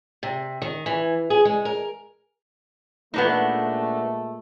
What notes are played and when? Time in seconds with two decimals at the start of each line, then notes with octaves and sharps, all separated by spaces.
0.23 C3
0.62 D#3
0.86 E3
1.30 G#4
1.45 G#3
1.65 A#4
3.14 A#2 G#3 A3 B3 D4 D#4